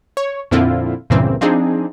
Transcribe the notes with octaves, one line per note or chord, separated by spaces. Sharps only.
C#5
F2 A#2 D3 C4 E4 F4
C#2 G2 A#2 C#3 E3 C4
F3 C4 D4 D#4 G#4